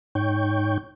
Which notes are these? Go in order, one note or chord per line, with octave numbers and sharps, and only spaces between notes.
G#2 D#4 C#5 G5 C#6 G6